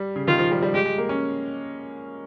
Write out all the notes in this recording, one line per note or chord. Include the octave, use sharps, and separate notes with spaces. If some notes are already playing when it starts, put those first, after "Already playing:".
Already playing: G3
C#3
D#3 F4
F3
G3
G3
G#3 G4
G#3
A#3
C#4